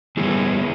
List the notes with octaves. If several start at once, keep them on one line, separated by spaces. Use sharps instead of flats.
G2 D#3 G3 B3 E4 G#4